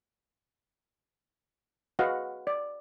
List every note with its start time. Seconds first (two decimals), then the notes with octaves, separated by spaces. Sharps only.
1.99 F#4 G#4 B4 D#5 F5 F#5
2.47 D5